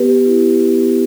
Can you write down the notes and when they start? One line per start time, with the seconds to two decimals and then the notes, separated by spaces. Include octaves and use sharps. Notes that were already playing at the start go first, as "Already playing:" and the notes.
Already playing: B3 G4 B4
0.25 E4
0.61 B3